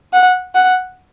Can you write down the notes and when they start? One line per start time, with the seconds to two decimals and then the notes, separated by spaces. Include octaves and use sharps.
0.13 F#5
0.55 F#5